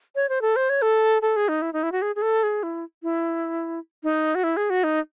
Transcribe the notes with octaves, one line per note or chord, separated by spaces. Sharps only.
C#5
C5
A4
C5
C#5
A4
A4
G#4
D#4
E4
D#4
E4
F#4
G#4
G#4
A4
G#4
E4
E4
D#4
F#4
E4
G#4
F#4
D#4